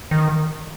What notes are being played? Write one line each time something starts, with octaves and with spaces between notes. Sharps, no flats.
D#3